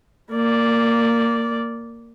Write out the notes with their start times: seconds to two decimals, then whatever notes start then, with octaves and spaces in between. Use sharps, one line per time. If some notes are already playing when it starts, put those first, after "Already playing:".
0.32 A#3 D5